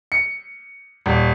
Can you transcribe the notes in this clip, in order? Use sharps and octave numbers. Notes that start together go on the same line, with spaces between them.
C#7
D#1